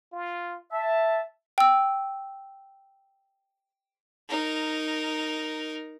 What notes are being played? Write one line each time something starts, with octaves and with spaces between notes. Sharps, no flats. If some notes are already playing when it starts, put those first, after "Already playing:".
F4
E5 A5
G5 E6
D#4 A#4